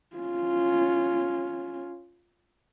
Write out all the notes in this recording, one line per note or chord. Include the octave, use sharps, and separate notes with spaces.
C#4 F4